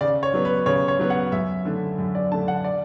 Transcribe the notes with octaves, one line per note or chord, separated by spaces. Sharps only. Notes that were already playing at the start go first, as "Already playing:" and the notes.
C#3 D5
C#5
F#3 B3
B4
C#3 C#5
C#5
F#3 B3
F#5
F#2 E5
D3 A3
F#2
D5
D3 A3 A5
F#5
D5